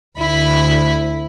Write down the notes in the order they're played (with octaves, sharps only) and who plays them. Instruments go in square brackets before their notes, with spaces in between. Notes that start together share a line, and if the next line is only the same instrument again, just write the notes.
[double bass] D2 [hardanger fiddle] E4 B5